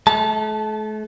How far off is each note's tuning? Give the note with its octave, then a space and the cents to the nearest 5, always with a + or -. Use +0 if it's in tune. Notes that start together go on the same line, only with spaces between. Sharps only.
A3 -40 A5 -10